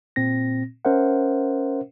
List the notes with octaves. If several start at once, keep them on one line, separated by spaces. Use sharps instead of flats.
A#2 C4 A#6
C#4 A#4 C5 E5 F#5